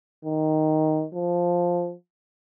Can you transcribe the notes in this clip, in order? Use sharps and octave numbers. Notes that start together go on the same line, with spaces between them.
D#3
F3